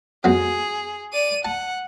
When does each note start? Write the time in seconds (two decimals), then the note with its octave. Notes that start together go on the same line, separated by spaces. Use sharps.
0.24 F2 F#3 B3 G#4
1.13 D5 D#7
1.45 F#5 A5